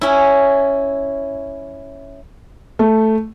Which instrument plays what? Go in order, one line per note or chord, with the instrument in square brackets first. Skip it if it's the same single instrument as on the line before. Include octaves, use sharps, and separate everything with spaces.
[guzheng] C#4 E4
[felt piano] A3